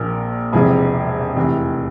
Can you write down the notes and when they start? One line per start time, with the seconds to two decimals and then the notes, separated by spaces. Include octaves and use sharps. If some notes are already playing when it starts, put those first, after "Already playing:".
Already playing: A#1 A#2 F3 A#4
0.53 E1 E2 C3 F3 G#4
1.36 F1 E2 E3